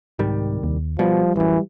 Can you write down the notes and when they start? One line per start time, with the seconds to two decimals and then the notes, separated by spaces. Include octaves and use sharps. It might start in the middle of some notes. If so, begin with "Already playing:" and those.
0.19 C2 G#2 D#3 G3
0.64 D#2
0.99 B2 F3 G3
1.36 A1 F#2 E3